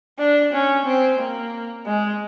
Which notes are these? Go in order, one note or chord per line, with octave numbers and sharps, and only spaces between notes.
D4
C#4
C4
A#3
G#3